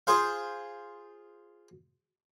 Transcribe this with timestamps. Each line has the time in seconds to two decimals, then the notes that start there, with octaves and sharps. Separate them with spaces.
0.07 F4 G#4 C5 F5